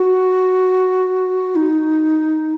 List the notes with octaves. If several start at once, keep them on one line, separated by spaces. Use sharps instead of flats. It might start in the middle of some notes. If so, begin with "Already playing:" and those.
Already playing: F#4
D#4